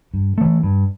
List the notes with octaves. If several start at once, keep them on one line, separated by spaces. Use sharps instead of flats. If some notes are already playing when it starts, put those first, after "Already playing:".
G2
E3 A3
G2